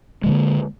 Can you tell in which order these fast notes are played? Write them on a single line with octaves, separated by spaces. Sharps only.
G#3 D#3 D3 A#3